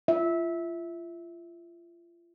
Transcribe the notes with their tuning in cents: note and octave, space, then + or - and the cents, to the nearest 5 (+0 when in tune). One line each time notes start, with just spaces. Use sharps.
F4 -30 E5 -15